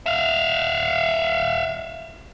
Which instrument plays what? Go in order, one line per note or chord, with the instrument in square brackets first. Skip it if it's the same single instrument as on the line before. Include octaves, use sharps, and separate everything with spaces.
[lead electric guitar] E5 F5